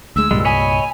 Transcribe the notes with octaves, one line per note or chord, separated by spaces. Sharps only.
D2 G#3 E6
C2 G2 A#2 G3 G#3
C#5 D#5 G#5 B5